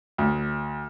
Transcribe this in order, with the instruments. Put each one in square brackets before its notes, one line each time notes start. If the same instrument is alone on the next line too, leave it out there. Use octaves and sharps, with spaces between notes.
[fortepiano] D2